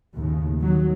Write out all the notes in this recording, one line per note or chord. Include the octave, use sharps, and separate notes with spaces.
D#2 A2 C#3
D#3 F#3